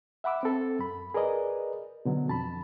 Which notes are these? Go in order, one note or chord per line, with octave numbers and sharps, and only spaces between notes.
E5 F#5 B5 D6 E6
C4 A4
F#2 B5
G#4 A#4 B4 D5 D#5
B2 D3 F#3
F2 A5 B5